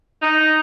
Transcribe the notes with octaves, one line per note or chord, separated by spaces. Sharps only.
D#4